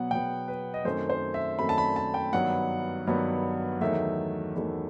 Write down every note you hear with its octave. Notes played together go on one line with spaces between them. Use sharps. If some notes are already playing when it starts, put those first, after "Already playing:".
Already playing: B2 F#3 B3 F#5
B2 F#3 B3 G5
B4
D#5
F#2 D#3 A3 C4 C5
C5
E5
F#2 D#3 A3 C4 B5
A5
B5
A5
G5
G2 D#3 F#3 B3 F#5
G2 D#3 F#3 B3
E2 D#3 F#3 A3 E5
E2 D#3 F#3 A3